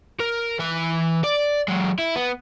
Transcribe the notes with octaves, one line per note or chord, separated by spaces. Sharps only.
A#4
E3 E5
D5
F#3 G#3
E4
B3